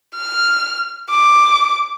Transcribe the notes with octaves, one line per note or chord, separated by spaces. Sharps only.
F6
D6